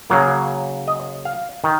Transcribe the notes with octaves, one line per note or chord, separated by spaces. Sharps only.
C#3 F#3 A#3
D#5
F5
D#3